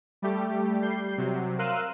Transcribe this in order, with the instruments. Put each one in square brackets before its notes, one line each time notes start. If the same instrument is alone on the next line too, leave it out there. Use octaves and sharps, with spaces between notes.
[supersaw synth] G3 A3 G4
G3 G6 C7
C3 F#3
A#4 F5 C6 E6 F#6 D#7